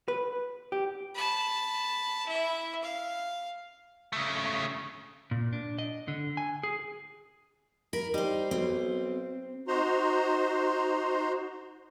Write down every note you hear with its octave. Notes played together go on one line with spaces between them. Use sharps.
B4
G4
A5 B5
E4 E5
F5
C#3 A3
A#2
D4
D#5
D3
G#5
G#4
A#4 B5
G3 D#4 C5
B1 C4
D#4 F#4 C5 A#5 C6